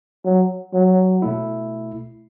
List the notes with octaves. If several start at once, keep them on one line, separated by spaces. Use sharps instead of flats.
F#3
F#3
B2 A3 E4